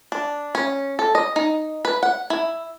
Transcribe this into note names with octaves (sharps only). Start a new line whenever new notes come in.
D4
C#4
A4
D#5
D#4
B4
F#5
E4